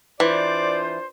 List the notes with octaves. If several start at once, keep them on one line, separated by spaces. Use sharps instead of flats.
E3 D4 F4 C5 D5